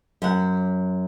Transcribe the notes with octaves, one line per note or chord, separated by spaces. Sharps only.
F#2 F#5